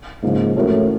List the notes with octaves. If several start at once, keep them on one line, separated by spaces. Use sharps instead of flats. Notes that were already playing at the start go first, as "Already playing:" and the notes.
G#2 C#3 F3 A#3
A2 E3 A3 C#4 F#4 A#4